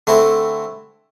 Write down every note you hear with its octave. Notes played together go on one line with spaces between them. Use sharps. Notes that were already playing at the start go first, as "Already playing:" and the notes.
D3 A3 C4 E4